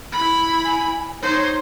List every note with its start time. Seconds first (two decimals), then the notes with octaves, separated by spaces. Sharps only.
0.12 E4 B5
0.65 G#5
1.22 D#4 C5 C#5